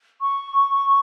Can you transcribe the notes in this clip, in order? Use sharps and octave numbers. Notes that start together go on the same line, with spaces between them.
C#6